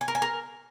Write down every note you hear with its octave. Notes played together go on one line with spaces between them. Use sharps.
G#5
A#4
G#5
A#4